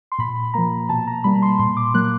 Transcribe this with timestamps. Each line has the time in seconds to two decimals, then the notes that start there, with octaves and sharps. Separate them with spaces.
0.12 C6
0.19 A#2 B5
0.54 F3 A#3 A#5
0.89 B2 A5
1.07 A#5
1.24 G3 A#3 B5
1.42 C6
1.59 A#2 C6
1.77 D6
1.94 F#3 A#3 F#6